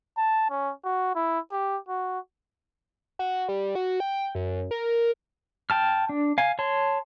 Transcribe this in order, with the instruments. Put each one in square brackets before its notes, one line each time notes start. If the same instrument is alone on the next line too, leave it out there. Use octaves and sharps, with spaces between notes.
[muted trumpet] A5
C#4
F#4
E4
G4
F#4
[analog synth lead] F#4
G3
F#4
G5
F#2
A#4
[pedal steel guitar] G5 A5 F6
D4
F5 G#5
C#5 A5 C6